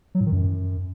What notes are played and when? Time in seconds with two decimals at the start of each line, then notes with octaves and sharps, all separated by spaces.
0.15 F#3
0.21 A2
0.26 D#3
0.32 F#2